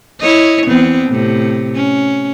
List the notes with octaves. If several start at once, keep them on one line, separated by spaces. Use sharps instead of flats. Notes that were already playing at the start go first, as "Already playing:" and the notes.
E4 C#5 D#5
E2 B3 C4
A2 C3
C#4